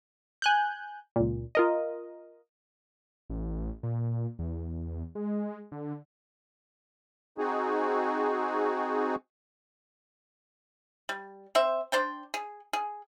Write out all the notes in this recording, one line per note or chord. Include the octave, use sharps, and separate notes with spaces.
G#5 F#6 G6
C#2 A#2
F4 A#4 D#5
A1
A#2
E2
G#3
D3
C4 D#4 F#4 G#4
G3
C4 C5 E5
D4 C5 D5 G5
G#4
G#4